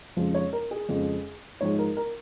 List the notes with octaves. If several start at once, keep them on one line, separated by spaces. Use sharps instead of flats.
F2 C#3 F3 G#3
C#5
A#4
G#4
F2 C#3 F3 G#3
G#2 F3 G#3 C#5
A#4
A#4